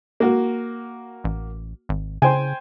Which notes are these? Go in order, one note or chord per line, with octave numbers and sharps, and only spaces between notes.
A#3 F#4
A1
G#1
C#3 C5 G5 G#5